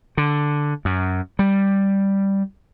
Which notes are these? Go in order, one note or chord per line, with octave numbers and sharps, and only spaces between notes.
D3
F#2
G3